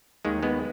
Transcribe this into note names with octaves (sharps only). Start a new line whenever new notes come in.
D#2 D#3 G#3
G#3 B3